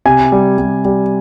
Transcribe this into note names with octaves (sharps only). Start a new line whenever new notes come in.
C3 G#5
G3
G3
G3